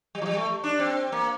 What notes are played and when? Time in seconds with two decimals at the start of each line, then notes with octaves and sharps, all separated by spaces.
0.15 G3
0.22 F3
0.26 G3
0.37 A3
0.64 D4
0.79 C4
1.12 A#3